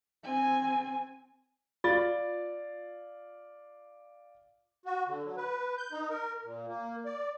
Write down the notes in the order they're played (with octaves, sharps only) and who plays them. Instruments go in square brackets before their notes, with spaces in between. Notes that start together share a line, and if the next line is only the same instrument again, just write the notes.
[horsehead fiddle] C4 G#5
[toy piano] F4 [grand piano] D5 F5 A6
[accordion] F#4
D3
F#3
B4
G6
D#4
A#4
A#2
A#3
D5